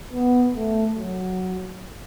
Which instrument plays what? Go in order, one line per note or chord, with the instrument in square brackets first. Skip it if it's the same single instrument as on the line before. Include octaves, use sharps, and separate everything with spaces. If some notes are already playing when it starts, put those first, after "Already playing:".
[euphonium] B3
A3
F#3